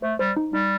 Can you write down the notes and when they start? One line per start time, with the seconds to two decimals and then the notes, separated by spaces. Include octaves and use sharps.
0.02 A3 C5
0.19 G3 C5
0.36 D#4
0.53 G3 D#4